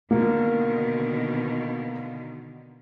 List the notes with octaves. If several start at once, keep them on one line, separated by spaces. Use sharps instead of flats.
B2 D3 D#3 A#3